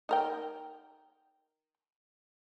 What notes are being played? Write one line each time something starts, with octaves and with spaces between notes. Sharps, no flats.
D#4 A#4 G5